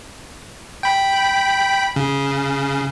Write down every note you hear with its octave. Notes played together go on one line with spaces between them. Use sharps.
G5 B5
C#3